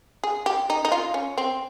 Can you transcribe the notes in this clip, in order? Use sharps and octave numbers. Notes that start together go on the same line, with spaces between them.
G#4
G4
D#4
D#4
F4
C#4
C4